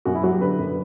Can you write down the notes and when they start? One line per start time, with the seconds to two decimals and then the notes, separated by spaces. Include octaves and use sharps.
0.05 F#2 F#4
0.15 E4
0.23 F#3 F#4
0.32 G4
0.41 D3 B4
0.59 F#2